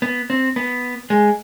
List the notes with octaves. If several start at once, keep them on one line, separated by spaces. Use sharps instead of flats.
B3
C4
B3
G#3